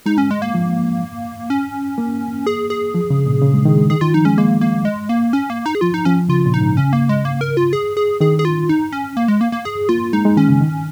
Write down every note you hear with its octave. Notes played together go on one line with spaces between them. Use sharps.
G#3 D#4
C#4
G#3
A#3
F3
C#4
A#3
G#4
G#4
F3
C#3
A#2
C#3
G#3
D#3
G#3
D#3 G#4
D#3 F4
F3 D#4
G#3 C#4
G#3 A#3
A#3
G#3
A#3
C#4
A#3
D#4
G#4
F3 F4
D#4
F3 C#4
C#3 F4
A#2
D#4
G#2
C#3 C#4
A#3
G#3
A#3
A#4
F4
G#4
G#4
D#3 G#4
G#4
F4
D#4
C#4
A#3
G#3
A#3
A#3
G#4
A#3 F4
G#3 D#4
G#3
D#3 C#4
C#3
D#3